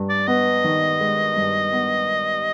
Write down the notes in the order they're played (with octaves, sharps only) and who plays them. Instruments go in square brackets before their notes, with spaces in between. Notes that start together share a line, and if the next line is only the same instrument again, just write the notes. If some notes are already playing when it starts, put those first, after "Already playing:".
Already playing: [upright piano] G2
[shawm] D5
[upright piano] B3 [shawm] D#5
[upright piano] D#3
G#3
G2
B3